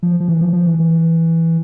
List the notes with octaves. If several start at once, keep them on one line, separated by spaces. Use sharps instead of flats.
F3
F3
E3
F3
F3
E3
E3